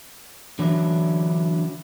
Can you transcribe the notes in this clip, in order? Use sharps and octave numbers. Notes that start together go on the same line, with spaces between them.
D3 E3 F#3 C#4 D4 E4